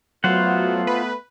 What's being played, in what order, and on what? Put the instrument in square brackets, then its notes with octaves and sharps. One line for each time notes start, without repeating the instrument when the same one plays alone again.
[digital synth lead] F#3 [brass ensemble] A3 B3 [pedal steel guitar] F4 C5 F#5
[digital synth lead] B4